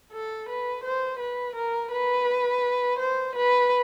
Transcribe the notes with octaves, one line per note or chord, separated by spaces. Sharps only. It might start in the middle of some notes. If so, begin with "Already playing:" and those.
A4
B4
C5
B4
A#4
B4
C5
B4